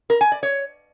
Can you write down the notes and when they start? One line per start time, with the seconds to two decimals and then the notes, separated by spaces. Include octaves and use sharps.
0.10 A#4
0.21 G#5
0.32 D5
0.43 C#5